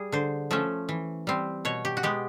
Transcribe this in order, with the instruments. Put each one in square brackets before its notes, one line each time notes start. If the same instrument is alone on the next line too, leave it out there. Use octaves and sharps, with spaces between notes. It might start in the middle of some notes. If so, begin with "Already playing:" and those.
Already playing: [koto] G3 G#4
D3 C5
F3 A3 C#4
E3
G3 C4
B2 C#5
G4
F#4
G#3 B3 G4